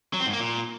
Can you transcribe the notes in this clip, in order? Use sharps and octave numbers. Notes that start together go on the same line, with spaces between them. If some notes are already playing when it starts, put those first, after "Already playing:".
F#3
C4
G#2
A#3
A#2